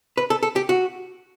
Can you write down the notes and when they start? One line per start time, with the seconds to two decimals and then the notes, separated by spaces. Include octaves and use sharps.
0.17 B4
0.30 A4
0.43 A4
0.56 G4
0.69 F#4